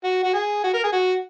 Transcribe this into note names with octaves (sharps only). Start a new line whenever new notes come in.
F#4
F#4
G#4
F#4
A#4
G#4
F#4